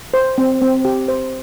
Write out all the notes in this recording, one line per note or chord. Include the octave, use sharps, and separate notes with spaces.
C5
C4
C4
G4
C5